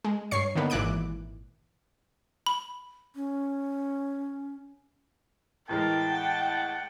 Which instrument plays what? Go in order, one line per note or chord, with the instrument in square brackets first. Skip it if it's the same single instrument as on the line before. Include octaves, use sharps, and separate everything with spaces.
[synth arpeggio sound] G#3
G2 C#5 C#6 C7
D3 D#3 A#3 B3
G#1 A#2 E3 D6 F#6 D7
[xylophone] B5
[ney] C#4
[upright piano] A2 E3 G#3 [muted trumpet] A#4 [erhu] G5 [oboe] A5
[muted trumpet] F#5